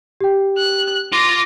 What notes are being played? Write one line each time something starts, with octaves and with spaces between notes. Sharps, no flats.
G4 G5
F#6
F4 C6 D6 A#6